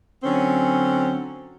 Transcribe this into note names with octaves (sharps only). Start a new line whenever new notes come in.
D3 F#3 C4 C#4